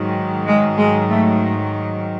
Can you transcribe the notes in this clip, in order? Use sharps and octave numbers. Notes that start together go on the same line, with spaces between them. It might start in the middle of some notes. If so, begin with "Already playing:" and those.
Already playing: G#2 D#3 F#3
G#3
G#3
A3